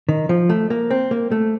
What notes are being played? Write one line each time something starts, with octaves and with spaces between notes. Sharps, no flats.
D#3
F3
A3
A#3
C4
A#3
A3